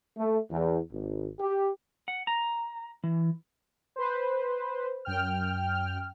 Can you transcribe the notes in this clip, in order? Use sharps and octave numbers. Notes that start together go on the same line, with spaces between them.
A3
E2
G#1
G4
F#5
A#5
E3
B4 C5
F#2 G5 F6